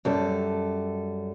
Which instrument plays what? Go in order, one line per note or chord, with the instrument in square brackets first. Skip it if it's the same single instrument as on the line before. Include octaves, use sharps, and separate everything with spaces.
[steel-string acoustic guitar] F#2 G3 A4